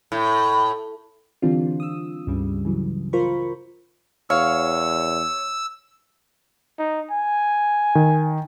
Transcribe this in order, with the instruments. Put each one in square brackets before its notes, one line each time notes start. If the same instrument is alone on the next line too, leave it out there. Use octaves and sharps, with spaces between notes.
[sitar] A2
[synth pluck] D3 E3 G3 C4 D4 F4
D#6 E6
C#2 G2 C#3 G3
C#3 E3 F#3
F4 A#4 C5 B5 C#6
[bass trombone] E2 [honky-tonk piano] C#5 [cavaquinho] F5 [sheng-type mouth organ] E6
[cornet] D#4
G#5
[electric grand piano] D#3